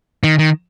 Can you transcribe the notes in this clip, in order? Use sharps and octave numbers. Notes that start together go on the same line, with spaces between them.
D#3
D#3